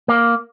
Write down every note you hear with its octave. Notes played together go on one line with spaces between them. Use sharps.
A#3